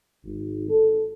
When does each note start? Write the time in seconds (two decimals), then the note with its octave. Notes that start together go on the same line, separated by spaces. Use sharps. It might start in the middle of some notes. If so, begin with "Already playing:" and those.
0.24 G#1
0.69 A4